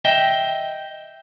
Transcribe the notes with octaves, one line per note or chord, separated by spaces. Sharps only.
D#5 E5 G5